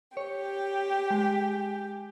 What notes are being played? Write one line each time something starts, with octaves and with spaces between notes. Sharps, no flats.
G4 C#5
G#3